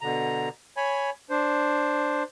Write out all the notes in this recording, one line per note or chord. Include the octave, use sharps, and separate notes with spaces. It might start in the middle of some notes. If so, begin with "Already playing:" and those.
B2 D3 A#5
C#5 G#5 B5
D4 C5